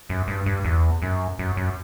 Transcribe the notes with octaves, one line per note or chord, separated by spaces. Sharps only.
F#2
G2
G2
E2
F#2
F#2
F#2